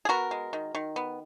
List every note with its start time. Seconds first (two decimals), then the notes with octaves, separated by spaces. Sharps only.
0.05 G#4
0.09 B3 F#4 A#4
0.31 G#3
0.53 D#3
0.75 D#3
0.96 B3